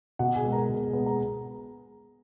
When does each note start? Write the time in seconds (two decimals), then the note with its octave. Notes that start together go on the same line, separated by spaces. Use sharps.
0.19 B2 F#4 F#5
0.35 G#4 G#5
0.44 G#3 B3
0.52 A#4 A#5
0.69 B2
0.93 G#3 B3
1.06 A#5